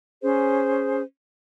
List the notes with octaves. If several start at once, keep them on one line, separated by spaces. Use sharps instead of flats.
C#4 G#4 C5